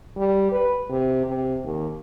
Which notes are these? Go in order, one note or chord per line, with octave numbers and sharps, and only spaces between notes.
G3
B4
C3
C3
D#2